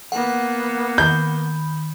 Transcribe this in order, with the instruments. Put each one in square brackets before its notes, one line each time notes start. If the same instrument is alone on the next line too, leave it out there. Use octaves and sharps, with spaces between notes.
[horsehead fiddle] A#3 B3 [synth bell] F#5
[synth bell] D#3 B5 [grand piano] G6